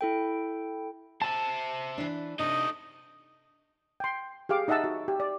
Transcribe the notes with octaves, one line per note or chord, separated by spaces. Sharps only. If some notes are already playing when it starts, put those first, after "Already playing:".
E4 A4 G5
C5 E5 A5
E3 D4
C3 A3 D4 D#4 D#5
G5 C6
G4 G#4 F5 D6
D#4 D#5 E5 F#5 A5 E6
F#4
G4
D5